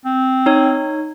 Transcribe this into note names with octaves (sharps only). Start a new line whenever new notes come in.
C4
D#4 C#5